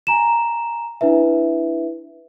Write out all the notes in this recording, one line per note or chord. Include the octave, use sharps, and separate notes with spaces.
G#5 A#5 E7
D4 E4 B4 E5